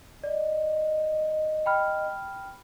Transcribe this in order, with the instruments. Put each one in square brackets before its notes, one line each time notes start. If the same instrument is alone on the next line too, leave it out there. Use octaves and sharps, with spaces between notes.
[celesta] D5 [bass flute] D#5
[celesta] G5 B5 F6